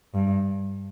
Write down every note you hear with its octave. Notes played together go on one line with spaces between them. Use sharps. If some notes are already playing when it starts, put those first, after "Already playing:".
G2